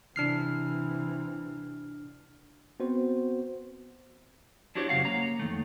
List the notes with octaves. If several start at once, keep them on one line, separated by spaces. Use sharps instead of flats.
C3 E3 D4 F6 C7
B3 C4 F#4 C5
D4 E4 F#4 G4 C5 C#5
F#2 C#3 C4 F5 F#5
A#3 C#5 A#5
F2 D#3 A3